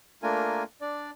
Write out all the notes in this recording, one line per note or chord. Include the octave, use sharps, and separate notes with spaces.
A3 A#3 D4 F4 A#4 G#5
D4 D5